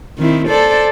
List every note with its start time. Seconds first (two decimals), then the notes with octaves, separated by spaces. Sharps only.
0.18 D#3 C4 E4
0.48 A4 C5 D5